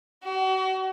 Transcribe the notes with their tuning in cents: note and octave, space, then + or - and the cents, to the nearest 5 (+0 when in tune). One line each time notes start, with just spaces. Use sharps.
F#4 +40